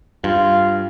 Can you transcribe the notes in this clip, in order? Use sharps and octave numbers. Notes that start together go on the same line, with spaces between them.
G2 F4